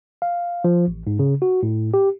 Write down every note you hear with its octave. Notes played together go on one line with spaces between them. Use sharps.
F5
F3
A1
G#2
C#3
F#4
A2
G4